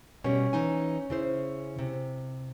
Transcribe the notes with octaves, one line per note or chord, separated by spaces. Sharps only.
B2 G3 C#4
E3 D#4 G#5
C#3 E4 C5
C3